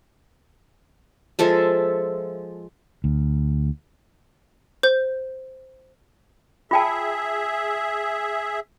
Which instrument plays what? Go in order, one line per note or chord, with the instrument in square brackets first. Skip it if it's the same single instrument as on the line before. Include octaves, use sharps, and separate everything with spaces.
[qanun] F3 G#3 A4 E5
[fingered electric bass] D2
[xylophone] C5 G6
[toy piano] F4 G5 A5 [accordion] G#4 E5